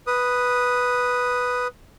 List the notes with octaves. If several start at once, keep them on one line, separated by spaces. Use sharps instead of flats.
B4 D#6